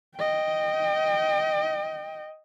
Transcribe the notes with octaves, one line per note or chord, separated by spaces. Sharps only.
D#5 G5